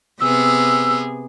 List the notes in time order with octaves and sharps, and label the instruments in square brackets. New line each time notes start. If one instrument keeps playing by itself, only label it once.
[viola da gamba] C3 B3 G#4 [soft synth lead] E6